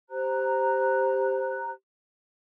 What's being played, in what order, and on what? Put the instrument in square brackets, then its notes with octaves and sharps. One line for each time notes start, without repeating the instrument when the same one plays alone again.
[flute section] G4 C5 A#5 F#6